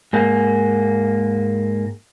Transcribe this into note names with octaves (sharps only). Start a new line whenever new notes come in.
G#2 A#3